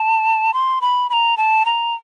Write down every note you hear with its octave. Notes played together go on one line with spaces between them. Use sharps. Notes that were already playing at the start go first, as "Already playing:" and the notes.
Already playing: A5
C6
B5
B5
A#5
A5
A#5